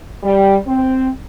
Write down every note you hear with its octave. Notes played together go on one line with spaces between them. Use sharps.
G3
C4